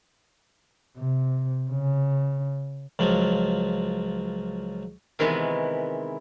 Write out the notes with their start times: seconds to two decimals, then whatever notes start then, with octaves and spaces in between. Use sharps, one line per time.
0.97 C3
1.70 C#3
2.99 C#2 F3 F#3
5.19 C3 D#3 E3 G#3 B3 B4